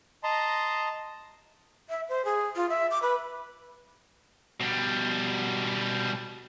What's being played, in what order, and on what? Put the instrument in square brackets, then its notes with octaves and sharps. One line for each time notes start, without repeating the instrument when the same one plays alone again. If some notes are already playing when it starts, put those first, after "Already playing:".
[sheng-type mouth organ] D#5 A5 A#5 C6
[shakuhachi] E5
C5
G#4
F4
E5
D6
B4
[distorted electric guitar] B2 G3